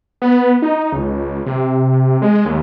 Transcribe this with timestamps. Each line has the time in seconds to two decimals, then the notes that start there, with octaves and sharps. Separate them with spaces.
0.22 B3
0.62 D#4
0.92 C#2
1.46 C3
2.22 G#3
2.45 D#2